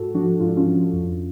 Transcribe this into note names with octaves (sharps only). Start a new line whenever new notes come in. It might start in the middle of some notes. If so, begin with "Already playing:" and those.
Already playing: G#2 F#4 A4
F3 D4 F#4
G#2 F4
D4
C#4 F4
F3
F2